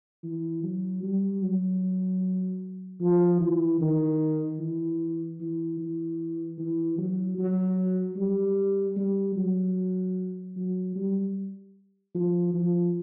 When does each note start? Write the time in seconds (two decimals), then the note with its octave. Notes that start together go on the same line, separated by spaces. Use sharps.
0.24 E3
0.63 F#3
1.03 G3
1.42 F#3
3.01 F3
3.41 E3
3.81 D#3
4.60 E3
5.40 E3
5.79 E3
6.58 E3
6.98 F#3
7.38 F#3
8.17 G3
8.97 G3
9.36 F#3
10.56 F#3
10.96 G3
12.15 F3
12.54 F3